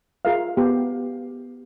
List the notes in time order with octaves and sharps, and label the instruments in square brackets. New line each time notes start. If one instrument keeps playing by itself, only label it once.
[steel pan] F4 G#4 A#4 E5 F5
B3 G4